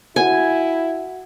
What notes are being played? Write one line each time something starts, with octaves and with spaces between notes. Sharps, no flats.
E4 F#4 F#5 G#5